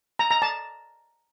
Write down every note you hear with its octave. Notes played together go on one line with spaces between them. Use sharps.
A#5
A#5
A5